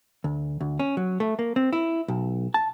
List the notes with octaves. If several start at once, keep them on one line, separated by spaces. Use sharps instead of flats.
D2
D2
C#4
F#3
A3
A#3
C4
E4
B1
A5